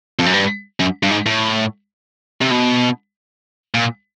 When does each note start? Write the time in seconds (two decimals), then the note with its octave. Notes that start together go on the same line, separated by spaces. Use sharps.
0.19 F2
0.26 F#2
0.33 G2
0.80 F#2
1.03 G2
1.11 G#2
1.26 A2
2.41 C3
2.51 B2
3.75 A#2